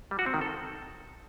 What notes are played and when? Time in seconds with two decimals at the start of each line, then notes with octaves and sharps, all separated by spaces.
0.11 G3
0.19 F#4
0.26 C4
0.34 D#3
0.41 A4